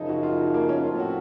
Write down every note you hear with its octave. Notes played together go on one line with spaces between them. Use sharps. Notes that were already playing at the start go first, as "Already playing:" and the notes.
Already playing: F#2 C#3 F3 D#4
F#4
F4
D#4
A#3
C#4
A2 F3 C4 F4
F#4